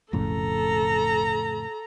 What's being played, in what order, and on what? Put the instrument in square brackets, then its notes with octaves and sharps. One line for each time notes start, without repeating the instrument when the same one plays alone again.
[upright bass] F1 B1 [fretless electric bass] F2 A2 C#3 [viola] A4 A#5